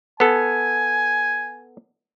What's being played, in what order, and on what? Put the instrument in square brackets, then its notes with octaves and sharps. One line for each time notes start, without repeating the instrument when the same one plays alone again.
[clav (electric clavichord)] B3 A4 [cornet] G#5